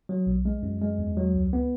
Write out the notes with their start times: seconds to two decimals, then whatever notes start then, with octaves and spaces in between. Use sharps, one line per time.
0.09 F#3
0.27 B1
0.45 G#3
0.63 F#2
0.81 G#3
0.98 E2
1.17 F#3
1.34 C#2
1.53 B3